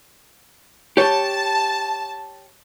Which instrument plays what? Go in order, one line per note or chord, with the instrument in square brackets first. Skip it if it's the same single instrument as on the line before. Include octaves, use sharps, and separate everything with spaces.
[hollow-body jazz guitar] G4 C#5 [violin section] A5